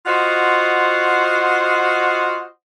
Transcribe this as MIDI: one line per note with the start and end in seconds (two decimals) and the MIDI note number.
0.06 2.46 65
0.06 2.46 66
0.06 2.46 72
0.06 2.46 75
0.06 2.46 78